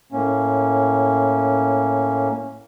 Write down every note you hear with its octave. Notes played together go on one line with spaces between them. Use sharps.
A2 A#3 C#4